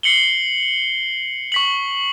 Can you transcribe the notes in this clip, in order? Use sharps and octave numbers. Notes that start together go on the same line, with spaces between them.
C7 C#7 F#7 G7
C#6 B6 F#7